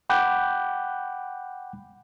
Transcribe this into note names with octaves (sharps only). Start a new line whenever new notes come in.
F#5 G5 B5 D6 F#6 G6